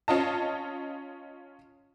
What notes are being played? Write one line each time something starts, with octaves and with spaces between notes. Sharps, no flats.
C#4 F4 D#5 A5